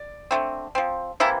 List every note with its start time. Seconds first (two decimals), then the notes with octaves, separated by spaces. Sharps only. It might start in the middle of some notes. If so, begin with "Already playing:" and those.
Already playing: D5
0.31 D3 A3 C4
0.75 F3 C4
1.20 C3 E3 A#3 E4